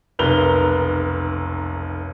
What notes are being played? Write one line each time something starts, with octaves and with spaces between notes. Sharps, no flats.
F1 B1 A#4 B4 F7 G7